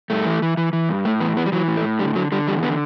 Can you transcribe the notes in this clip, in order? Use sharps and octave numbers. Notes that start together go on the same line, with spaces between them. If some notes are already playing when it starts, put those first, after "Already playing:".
G2 A3
E3
E3
E3
E3
G2
A2 A3
E3 B3
E3 B3
G3
E3 F#3
A2
A3
A2
D3 G3
D3 F#3
D3 G3
E2 G3
D3 B3